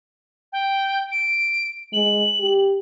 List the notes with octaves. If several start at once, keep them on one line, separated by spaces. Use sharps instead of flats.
G5
D7
G#3 F#7
G4